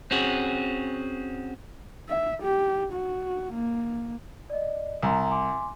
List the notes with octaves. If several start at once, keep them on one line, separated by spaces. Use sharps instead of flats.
C4 C#4 F#4 G#4
E5
G4
F#4
A#3
D5 D#5
C2 G#5 A#5 C6
G#5 C6 D6